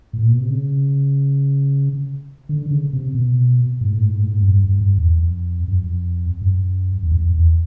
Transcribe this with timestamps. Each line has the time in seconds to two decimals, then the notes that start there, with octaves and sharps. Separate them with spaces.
0.13 A2
0.22 A#2
0.32 B2
0.40 C3
0.50 C#3
2.49 D3
2.66 D3
2.70 C#3
2.93 C3
3.15 B2
3.81 G#2
3.90 A2
3.98 G#2
4.07 A2
4.16 G#2
4.24 A2
4.33 G#2
4.41 F#2
4.47 G2
4.64 G2
4.81 G2
4.97 E2
5.13 F2
5.68 F#2
5.80 F2
6.41 G2
6.46 F#2
7.03 E2
7.12 F2
7.34 E2